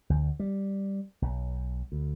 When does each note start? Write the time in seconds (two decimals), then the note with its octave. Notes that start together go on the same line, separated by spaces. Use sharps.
0.10 D2
0.39 G3
1.22 B1
1.92 D2